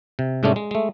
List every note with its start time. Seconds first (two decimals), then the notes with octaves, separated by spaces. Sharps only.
0.19 C3
0.43 G#2 C3 G#3 A3 C#4 D4
0.56 G#3
0.71 G#3 A3